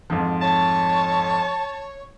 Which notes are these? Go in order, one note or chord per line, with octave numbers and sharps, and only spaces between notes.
F2 G#2 F3
C#5 A5